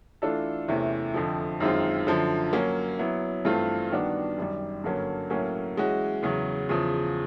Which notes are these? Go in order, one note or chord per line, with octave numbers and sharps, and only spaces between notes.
E3 A3 D4 F4 A4
E2 C3 E3 A3 C#4
F2 D3 F3
F#2 D#3 G#3 C4 F4
F#2 D3 F3
F#3 A#3 C#4
F#3 B3 E4
G2 E3 A3 C4 F4
D#3 G3 B3 D4 F#4
F#2 D#3 G3
G2 D3 F#3 A#3 C#4
A2 F#3 A#3 C#4
E3 G#3 C#4 F#4
E2 C#3 F#3
E2 C#3 F3